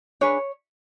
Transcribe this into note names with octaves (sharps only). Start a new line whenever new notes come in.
D4 G#4 B4 C#5